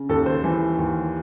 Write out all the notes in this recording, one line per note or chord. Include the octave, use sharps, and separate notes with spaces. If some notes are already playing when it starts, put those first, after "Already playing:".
Already playing: C#3
D#2 A4
C5
E3
D#2